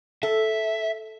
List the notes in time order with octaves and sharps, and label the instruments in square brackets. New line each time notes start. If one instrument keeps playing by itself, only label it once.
[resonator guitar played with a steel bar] A4 [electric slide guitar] E5